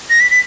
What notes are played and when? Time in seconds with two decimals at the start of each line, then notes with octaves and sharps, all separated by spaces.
0.10 A#6
0.20 B6
0.31 B6